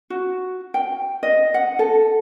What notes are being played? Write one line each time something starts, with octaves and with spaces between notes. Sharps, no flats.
F#4
G5
D#5
F#5
A4